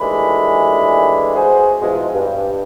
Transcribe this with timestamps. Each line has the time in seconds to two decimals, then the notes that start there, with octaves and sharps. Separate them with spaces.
0.01 D#2 E3 G#3 A3 D4 B5
1.35 F#4 G#4 C5
1.81 G#2 B2 E3 F3 G#3
2.14 G2